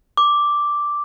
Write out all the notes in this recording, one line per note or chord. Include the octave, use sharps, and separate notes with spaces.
D6